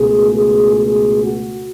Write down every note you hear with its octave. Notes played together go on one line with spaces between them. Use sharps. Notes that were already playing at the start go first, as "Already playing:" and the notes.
Already playing: C#2 B2 A3 G#4
G#4
G#4
F#4